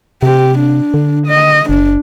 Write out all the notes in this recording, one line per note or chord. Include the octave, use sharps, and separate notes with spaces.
C3 G4
D4
D3
D#5
F#1 D4